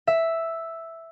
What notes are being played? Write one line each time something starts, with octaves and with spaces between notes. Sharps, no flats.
E5